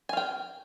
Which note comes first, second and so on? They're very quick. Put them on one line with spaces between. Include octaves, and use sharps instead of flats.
G#5 F5 G5